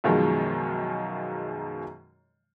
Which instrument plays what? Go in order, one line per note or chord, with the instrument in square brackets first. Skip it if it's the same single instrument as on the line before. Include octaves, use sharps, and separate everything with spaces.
[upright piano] F#2 B2 D#3 F3 G#3